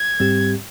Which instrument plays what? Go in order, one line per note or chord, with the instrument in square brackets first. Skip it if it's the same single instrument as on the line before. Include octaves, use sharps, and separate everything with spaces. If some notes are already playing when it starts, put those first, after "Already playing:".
Already playing: [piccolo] G#6
[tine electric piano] G#2 G3 C4 G4